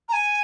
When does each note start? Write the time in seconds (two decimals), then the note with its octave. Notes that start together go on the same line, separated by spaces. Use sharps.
0.08 A#5
0.13 G#5